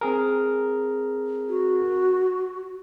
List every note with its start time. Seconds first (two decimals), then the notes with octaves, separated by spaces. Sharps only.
0.01 C4 G#4 A#4
1.49 F#4